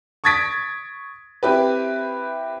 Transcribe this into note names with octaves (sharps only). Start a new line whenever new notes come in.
C#6 D#6 G#6 A6 B6 D7
C4 E4 G4 B4